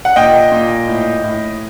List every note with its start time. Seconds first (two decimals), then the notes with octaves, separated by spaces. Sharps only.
0.05 F#5
0.16 A#2 D#5 G5
0.52 A#2
0.88 A2
1.24 A2